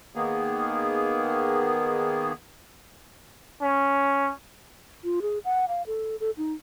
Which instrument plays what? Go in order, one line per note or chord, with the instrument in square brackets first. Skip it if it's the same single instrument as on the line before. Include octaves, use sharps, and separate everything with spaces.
[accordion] D#3 A#3 B3 G#4
[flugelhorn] C#4
[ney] F4
G#4
F#5
F5
A4
A4
D#4